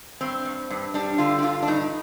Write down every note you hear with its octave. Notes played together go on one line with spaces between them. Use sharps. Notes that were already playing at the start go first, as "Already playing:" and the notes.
G2 C4
G2
G2
G3 D4
D3 F4
G4
G2 F4
D4
G2 D#4